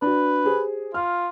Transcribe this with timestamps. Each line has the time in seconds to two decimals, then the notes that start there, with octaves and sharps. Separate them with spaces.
0.02 D4 F#4 B4
0.44 G4 G#4 C5
0.94 F4 F6